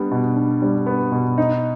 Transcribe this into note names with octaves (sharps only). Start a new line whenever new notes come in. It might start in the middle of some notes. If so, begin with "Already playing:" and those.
Already playing: G3 B3 D4
B2
D4
G3
B3
B2
D#4